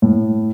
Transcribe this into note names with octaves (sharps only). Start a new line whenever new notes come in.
A2